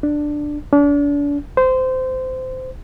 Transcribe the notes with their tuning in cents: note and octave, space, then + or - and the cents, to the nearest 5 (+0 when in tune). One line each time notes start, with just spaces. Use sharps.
D4 +10
D4 -35
C5 -20